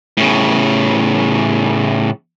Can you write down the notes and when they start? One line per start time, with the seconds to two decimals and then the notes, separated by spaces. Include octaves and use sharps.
0.17 A2 C#3